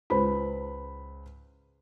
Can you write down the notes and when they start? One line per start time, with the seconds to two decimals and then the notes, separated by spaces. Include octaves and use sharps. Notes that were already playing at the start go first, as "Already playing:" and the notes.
0.10 C#2 B4 C5 B5